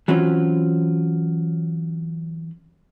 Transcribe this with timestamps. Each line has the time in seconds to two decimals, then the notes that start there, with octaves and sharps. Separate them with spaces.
0.08 E3 F#3 C4 C#4 F4